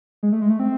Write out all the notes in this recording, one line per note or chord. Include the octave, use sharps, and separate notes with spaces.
G#3
A3
G#3
A3
C4